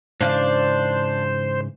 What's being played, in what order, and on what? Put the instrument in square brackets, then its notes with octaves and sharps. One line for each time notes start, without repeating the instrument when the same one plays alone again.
[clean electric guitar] G#2 C#3 E3 [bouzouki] D4 F5 [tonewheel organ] C5